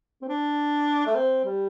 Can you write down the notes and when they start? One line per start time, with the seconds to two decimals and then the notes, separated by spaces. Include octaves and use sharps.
0.22 C4
0.28 D4
1.07 A3
1.15 C4
1.45 G3